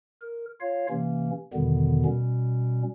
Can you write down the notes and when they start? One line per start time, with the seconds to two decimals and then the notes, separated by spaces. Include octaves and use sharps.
0.22 A#4
0.61 F4 C#5 F5
0.90 C3 E3 A#3 C#4
1.54 E2 B2 D3 D#3 G3 B3
2.05 B2 G3 C#4